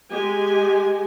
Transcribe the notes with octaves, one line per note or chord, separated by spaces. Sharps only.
G#3 G4 G#5